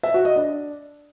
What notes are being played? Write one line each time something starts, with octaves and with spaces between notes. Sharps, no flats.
E5
F#4
D#5
D4